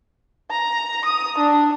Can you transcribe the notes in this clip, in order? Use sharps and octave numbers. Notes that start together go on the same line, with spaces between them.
A#5
D#6
D4